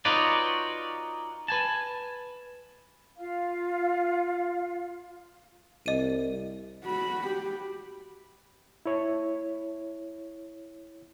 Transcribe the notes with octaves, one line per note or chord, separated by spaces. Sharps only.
D#4 F4 F#4 B4 C#5 D5
B4 G#5 A5
F4 F5
C2 D#5 D#7
F#4 B5
G4
E4 C#5